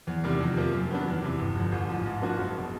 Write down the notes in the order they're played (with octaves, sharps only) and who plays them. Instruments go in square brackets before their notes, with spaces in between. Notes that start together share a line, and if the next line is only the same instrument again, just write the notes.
[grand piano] E2
C3 D#3 G3
F2
C3 F3 A#3
F#2
D#3 F#3 B3 D4
E2
C3 E3
G1
F2 D3
A1
G#2 F3
G#2
F3 A#3 D4 F#4
F#1
B2